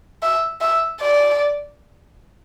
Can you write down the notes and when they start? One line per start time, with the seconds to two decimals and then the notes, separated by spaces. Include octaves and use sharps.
0.22 E5
0.61 E5
1.00 D5